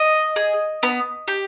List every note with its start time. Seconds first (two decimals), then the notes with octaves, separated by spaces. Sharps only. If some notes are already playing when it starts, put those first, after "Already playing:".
Already playing: D#5
0.36 G#4
0.83 B3
1.28 G4